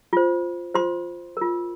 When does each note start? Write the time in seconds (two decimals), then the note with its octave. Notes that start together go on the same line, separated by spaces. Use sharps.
0.13 F4 C5
0.74 F4 C5 C6
1.37 F4 A#4